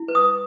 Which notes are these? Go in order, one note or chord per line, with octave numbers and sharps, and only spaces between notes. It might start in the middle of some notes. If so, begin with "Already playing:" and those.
Already playing: E4
B4
D#6